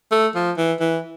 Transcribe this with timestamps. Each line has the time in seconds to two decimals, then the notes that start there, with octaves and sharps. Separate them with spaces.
0.11 A3
0.35 F3
0.57 E3
0.80 E3